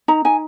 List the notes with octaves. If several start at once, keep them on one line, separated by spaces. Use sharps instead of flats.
D#4 A#5
D#4 G#5